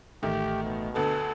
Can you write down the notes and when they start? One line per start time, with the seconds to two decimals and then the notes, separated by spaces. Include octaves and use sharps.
0.23 A1 D#3 A3 G4
0.64 B2
0.95 D2 D3 B3 A4